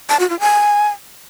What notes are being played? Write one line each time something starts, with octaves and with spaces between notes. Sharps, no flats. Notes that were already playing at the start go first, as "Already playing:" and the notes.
A5
F#4
F4
G#5